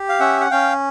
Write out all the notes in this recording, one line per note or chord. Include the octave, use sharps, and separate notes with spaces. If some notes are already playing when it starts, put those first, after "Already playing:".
Already playing: G4
F5
C#4 E5 F#5
F#5
C#4 F5 G5